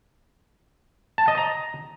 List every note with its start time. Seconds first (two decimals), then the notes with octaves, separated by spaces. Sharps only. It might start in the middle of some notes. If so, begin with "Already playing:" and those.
1.18 A5
1.28 D#5
1.38 A#5